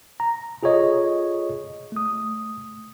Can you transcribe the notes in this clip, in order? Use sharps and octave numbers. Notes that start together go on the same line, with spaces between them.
A#5
F4 G#4 A4 C#5 D#5
A3 D#6